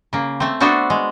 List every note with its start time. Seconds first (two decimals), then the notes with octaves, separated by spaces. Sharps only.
0.13 C#3 A#3
0.40 A3 C4
0.60 A3 B3 D4 F#4 A4 C5
0.90 G#3